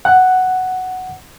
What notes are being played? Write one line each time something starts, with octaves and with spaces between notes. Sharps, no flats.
F#5